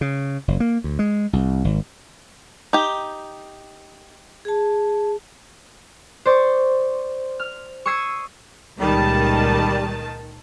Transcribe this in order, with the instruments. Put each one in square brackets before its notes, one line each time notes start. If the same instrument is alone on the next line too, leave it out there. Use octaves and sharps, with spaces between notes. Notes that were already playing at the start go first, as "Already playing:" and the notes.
[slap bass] C#3
F#1
A#3
D2
G#3
C2
G#1
[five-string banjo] D#4 G4
[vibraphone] G#4 A5
[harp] C5 D5 C#6
F6
C#6 D#6 E6 G#6 C7 D#7
[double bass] C#2 A#2 [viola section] D#3 A5 [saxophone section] G3